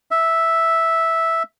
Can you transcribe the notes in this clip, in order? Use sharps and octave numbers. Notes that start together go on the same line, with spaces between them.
E5